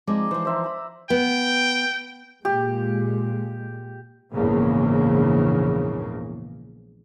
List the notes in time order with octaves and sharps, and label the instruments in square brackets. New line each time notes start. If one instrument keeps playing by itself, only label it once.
[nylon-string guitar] F3 G#3 C4 [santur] D#4 D5
[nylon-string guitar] E3 F3 [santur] C5
[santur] C5 E5 A#5
A#5 B5
[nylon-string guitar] B3 [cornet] G5
[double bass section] A#2 G#3 [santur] G4
[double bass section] A#1 E2 G#2 C#3 A#3